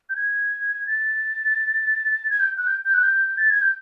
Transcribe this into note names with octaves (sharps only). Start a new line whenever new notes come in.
G6
G#6
A6
G#6
G6
F#6
G6
G6
F#6
G6
A6
G#6
G6